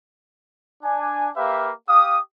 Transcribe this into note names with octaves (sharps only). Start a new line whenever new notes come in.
D4 G#5
A#3 G4 B4 E5 F5
G4 F5 D#6